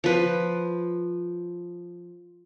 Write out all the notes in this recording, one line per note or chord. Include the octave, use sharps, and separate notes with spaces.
F3 B4